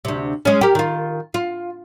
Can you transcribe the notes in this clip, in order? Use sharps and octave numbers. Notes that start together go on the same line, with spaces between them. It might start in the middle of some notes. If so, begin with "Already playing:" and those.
D2 C3
G#3 C#4
G4 A#4
D#3 F4
F4